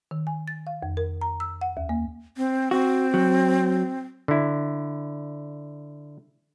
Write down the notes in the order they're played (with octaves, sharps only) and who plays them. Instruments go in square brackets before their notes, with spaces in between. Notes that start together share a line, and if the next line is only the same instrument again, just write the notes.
[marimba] D#3
G#5
A6
F5
F2
A#4
A#5
E6
F#5
D#2
A#3
[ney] C4
[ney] C4 [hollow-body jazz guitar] F#4
[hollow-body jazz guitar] F#3
[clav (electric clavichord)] D3 E4